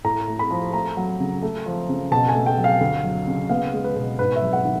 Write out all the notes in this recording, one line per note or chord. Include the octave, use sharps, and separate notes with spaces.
A2 A#5
A3
B5
F3
A3 A#5
F#3
C#3
A3
F3
C#3
B2 A5
G#5
A3
G5
F#3
F5
D2
F#3
C#3
B3 F5
G#3
B4
B2
G#2 B4
E5
F#3
F#5
D#3